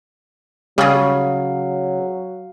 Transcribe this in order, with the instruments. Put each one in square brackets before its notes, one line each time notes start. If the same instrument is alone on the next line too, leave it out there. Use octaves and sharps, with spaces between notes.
[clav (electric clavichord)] C#3 [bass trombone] F#3 [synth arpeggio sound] G3 G#4 [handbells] F5